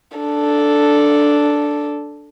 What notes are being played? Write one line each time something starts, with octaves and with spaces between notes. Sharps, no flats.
D4 A4